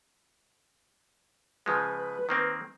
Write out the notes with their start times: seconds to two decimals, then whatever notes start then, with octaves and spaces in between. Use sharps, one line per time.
1.66 C#3 F3 G#3 B4
2.29 D#3 A#3 C4